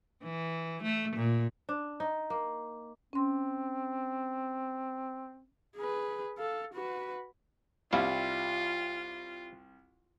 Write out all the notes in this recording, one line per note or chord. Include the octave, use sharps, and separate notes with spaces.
E3
A3
A#2
D4
D#4
A#3
C4 C#4 C6
G#4 B4
A4 F5
F#4 B4
C2 G3 E4 F4 F5